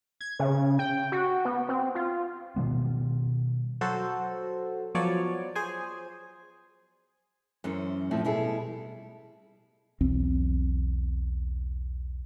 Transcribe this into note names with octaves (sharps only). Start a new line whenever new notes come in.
G#6
C#3
G5
F#4
B3
C4
F4
B2 D#3 G3 B3
F#3 F#4 A4 C5
F3 F#3 B3 C#5 D5
G#4 C5 G#5
F#2 E3 C#4 C5
E2 A2 F3 C4 E4
B2 G3 B3 E4 G#4 A4
B1 E2 C4